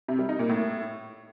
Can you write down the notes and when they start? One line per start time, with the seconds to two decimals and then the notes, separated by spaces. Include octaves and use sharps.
0.08 C3
0.19 G3
0.29 D#4
0.39 A#2
0.49 A2